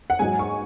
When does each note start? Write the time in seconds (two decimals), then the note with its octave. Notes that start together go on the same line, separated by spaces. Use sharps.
0.10 F#5
0.19 G#2 F#3 D#4 G#5
0.39 C#6